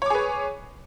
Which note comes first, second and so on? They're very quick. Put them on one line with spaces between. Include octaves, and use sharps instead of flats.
C#5 D6 G#4 B4